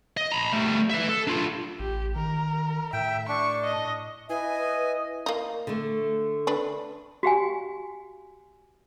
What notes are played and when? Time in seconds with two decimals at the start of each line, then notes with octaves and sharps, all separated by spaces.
0.17 D#5
0.32 A#5 B5
0.53 G3 A3
0.90 B4 E5
1.09 A4
1.27 D4 F4
1.79 A1 G4
2.16 D#3 A#4
2.93 A2 E5 G5
3.29 D4 C#6
3.64 D#5
4.29 E4 B4 D#5 G#5
5.26 A#3 D#4
5.67 D3 A3
6.47 D4 B4
7.23 F#4 G4 F5 G#5